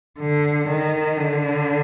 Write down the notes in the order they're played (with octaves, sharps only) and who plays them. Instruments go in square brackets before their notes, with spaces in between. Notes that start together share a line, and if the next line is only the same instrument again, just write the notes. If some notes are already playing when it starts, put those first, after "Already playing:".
[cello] D3
D#3
D3